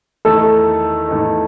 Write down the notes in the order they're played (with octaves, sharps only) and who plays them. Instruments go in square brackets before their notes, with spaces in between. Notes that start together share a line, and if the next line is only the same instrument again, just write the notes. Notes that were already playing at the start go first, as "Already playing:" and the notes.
[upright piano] E2 D#3 A3 D#4 [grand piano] A4
[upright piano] E2 D#3 A3 D#4